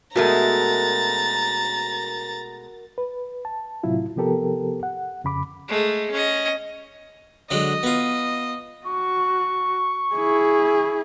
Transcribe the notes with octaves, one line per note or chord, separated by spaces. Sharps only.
B2 G#3 A3 F#4 A#4 A#5 A6
B4
A5
A2 C3 F#3 E4 F4
C3 F3 B3 G4 A4 A#4
F#5
F2 C#3 B5 D6
G#3 A3
C#4 D#5
D3 F#3 G#3 D#5
B3 F4
F#4 C#6
E4 G#4